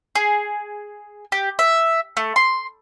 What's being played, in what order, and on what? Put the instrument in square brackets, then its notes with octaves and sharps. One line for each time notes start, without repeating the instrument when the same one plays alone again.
[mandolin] G#4
G4
E5
A3
C6